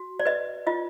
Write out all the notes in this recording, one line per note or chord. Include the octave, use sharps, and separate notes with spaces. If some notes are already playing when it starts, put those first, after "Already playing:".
Already playing: F#4
D5
B4 D#5
F4 D#5